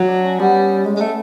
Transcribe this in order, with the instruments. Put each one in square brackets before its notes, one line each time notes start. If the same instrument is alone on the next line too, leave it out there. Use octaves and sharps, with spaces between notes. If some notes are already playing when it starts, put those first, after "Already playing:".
Already playing: [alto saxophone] F#3
[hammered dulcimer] D4
C#4
[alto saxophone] G3 [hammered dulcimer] B3
[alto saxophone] G#3
G#3
A3